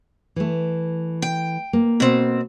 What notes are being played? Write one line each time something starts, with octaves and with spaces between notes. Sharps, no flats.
E3 A3
G5
A#3
B2 C4